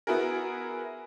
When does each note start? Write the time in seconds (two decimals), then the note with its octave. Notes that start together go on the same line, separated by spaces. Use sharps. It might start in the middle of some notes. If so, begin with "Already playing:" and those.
0.07 B3 E4 F#4 G#4 A#4